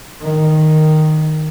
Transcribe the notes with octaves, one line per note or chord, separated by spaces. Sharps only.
D#3